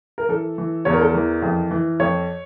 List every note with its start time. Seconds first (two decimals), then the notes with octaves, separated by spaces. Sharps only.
0.18 A#4
0.29 E3 A4
0.58 E3
0.85 E2 C#5
0.93 A#4
1.01 A4
1.10 E3 A#4
1.42 F2
1.71 E3
2.00 F2 C#5